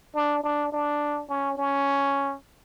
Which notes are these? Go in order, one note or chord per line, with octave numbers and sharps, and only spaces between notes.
D4
D4
D4
C#4
C#4